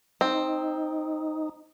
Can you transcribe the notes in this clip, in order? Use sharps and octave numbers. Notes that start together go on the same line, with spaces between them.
C4 D#4